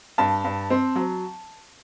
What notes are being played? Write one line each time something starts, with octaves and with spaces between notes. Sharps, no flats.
G2 A5
G2
C4
F#3